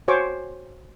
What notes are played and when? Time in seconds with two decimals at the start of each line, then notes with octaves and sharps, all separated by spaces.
0.08 F#4 C5 C#5 G#5 C#6 D6